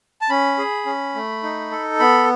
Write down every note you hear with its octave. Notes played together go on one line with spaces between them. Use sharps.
A5
C#4 B5
G#4
C#4
A3
D#4
A4
B3 B5